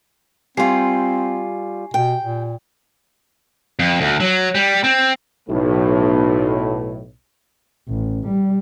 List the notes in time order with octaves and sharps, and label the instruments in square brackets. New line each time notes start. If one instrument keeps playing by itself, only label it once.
[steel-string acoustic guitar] G3 F4 [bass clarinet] C4 [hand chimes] G4 G#5 C7
[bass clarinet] B2 [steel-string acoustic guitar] G5
[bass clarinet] A#2
[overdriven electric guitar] F2
D2
F#3
G3
C4
[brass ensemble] B1 A2
[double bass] A1
G3